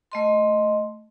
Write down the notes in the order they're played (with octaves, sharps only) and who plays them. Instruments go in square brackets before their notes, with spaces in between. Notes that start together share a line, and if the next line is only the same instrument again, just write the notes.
[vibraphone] A3 D#5 C6